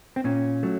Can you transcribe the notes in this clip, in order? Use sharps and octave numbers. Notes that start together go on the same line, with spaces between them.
C4
A#2 C#4
F#3 A3